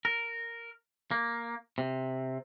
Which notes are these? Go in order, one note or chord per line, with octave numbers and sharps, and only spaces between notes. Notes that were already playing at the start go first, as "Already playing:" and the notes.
A#4
A#3
C3